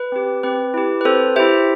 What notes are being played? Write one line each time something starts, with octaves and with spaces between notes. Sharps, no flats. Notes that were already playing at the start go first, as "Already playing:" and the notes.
Already playing: B4
C4 G4
C4 B4
E4 G4
B4
C4 A4 C5
E4 G4 C5 E5